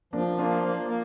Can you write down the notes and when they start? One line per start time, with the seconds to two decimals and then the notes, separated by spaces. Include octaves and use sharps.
0.13 F3 A#3 D4
0.38 A#3 D4 F4
0.63 A#3
0.88 A#3